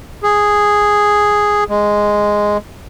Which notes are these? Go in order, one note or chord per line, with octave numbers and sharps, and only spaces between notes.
G#4
G#3